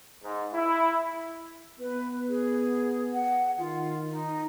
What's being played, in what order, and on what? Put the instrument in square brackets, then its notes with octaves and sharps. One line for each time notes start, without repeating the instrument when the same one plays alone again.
[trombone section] G#2
E4
[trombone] B3 [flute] B4
[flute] G#4
F#5
[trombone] D#3 [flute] F4
[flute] D#4